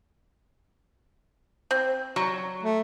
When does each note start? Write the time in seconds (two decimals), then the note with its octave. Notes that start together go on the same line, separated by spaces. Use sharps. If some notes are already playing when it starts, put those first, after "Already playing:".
1.71 C4
2.16 F#3 C#6
2.63 A3